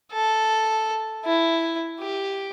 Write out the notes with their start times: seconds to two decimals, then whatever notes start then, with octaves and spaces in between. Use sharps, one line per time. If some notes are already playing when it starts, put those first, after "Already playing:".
0.12 A4
1.25 E4
2.00 G4